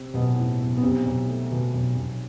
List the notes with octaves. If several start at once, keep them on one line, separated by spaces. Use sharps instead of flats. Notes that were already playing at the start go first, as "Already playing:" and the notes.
Already playing: C3 C4
B1 B2 B3
A2
B1
B3
B1 C3 C4
B1
A3
B2
B1
B1